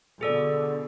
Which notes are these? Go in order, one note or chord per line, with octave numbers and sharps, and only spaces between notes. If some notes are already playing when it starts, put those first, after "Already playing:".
B2 D3 G#4 A4 D5